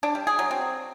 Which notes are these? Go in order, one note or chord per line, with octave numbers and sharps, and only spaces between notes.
D4
G3
G#4
F#3
C4